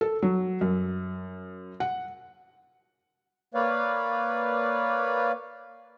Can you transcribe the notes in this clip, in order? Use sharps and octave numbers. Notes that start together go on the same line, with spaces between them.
A4
F#3
F#2
F#5
A#3 B4 C#5 D5 F5